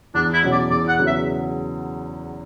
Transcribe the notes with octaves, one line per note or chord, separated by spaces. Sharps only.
E2 D4
E4
B2 F#3 C#4
D5
E2 D5
F#5
C#3 F#3 B3
E5